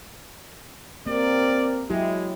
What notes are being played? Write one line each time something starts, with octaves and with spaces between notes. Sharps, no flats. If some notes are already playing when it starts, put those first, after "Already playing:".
A#3 C4 G4 A#4 D5
F#3 G#3 E4 G4